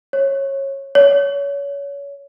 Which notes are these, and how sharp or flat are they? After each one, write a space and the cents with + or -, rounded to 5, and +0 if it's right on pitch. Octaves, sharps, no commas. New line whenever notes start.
C#5 -20
C#5 +25